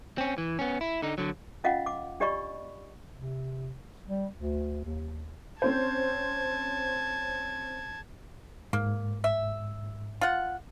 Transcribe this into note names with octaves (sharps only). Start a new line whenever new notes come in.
C4 C#4
E3
B3 C#4
E4
D3 D#4
D3 F#3
C#4 F4 D#5 F5 F#5
D6
D4 G4 D5 D#5 B5 C#6
C3
G3
D2
D#2
C4 C#4 C5 A5 G#6
G#2 A#3
E5
F4 F#5